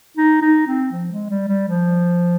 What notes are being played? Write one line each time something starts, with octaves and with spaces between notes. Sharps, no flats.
D#4
D#4
C4
F3
G#3
G3
G3
F3